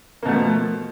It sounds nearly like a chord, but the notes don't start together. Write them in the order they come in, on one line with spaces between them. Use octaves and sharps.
A#3 B2 A3 F3